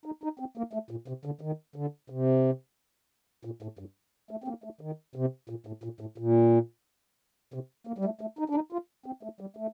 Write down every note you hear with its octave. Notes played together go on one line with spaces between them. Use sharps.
D#4
D#4
C4
A#3
A3
A#2
C3
D3
D#3
D3
C3
A#2
A2
G2
A3
C4
A#3
A3
D#3
C3
A#2
A2
A#2
A2
A#2
C3
A#3
G3
A3
A3
D#4
D4
D#4
F4
C4
A3
G3
A3